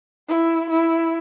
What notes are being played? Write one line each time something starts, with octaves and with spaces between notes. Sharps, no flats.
E4
E4